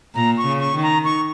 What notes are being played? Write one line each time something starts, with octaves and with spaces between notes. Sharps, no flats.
A#2 A#5
C#6
C#3
C#6
D#3
A#5
C#6